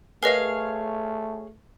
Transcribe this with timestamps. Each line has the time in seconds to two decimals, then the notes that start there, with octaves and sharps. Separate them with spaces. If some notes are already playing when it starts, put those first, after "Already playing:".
0.23 A3 G#4 A#4 B4 C#5 D#5 F5